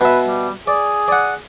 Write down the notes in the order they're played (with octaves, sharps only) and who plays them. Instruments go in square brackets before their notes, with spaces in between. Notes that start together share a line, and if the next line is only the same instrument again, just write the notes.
[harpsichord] B2 E5 [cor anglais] B4
[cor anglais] G3
[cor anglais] G#4 [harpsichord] D5
[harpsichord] D5 F#5